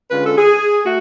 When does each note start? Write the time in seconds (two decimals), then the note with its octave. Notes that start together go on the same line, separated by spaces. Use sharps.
0.10 D3 G#3 C#4 F4 B4
0.23 A4
0.36 G#4
0.85 A3 F#4